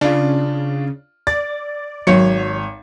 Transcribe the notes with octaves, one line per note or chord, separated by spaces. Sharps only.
C#3 D4 F4
D5 A6
G#1 F#3 C#5 C#7